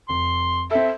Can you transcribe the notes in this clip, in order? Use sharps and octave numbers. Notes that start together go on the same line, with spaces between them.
F1 C6
C4 A4 E5